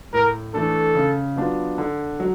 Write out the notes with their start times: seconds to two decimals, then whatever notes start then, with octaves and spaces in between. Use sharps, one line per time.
0.13 A2 A#4
0.54 E3 A3 D4 A4
0.95 C#3
1.36 F#3 B3 D4 F4
1.78 D3
2.20 F#3